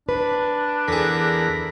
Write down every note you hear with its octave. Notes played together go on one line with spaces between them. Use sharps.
D4 B4
E2 D3 G#4 A#4 B5